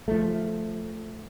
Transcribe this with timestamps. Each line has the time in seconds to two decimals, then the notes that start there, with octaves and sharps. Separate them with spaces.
0.08 F3 A3